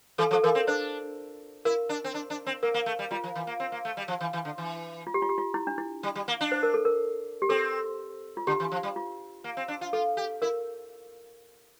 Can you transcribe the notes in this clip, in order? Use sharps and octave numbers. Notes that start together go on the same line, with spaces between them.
E3 A4
F3
A4
E3 A#4
C4
D4 C5
E4 A#4
D4
C4
D4
D4
C4
A#3 A#4
A#3
A3
G3
G3 F4
F3
E3
A#3
C4
A#3
A3
G3
F3
E3
E3
D3
E3
F4
G4
F4
G4
F4
E4
D4
E4
G3
G3
A#3
D4
C5
A#4
A4
A#4
G4
C4 A4
F4
D3 G4
E3
F3
G3
F4
A#3
C4
D4
F4
F4 A4
G4
E4 A#4